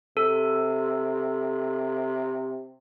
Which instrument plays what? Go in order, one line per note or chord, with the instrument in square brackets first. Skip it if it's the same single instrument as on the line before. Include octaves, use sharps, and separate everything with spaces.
[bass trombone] C3 [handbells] A4